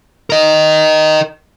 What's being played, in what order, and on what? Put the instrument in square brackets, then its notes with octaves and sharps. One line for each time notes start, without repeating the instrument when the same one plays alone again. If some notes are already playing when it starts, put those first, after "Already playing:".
[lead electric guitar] A#4 D#5